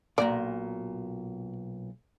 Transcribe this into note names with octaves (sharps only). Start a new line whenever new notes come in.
B1 A#2 D5 A#5